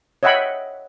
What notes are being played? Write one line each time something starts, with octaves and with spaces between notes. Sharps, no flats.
C#5 D#5 E5 F#5 G5 B5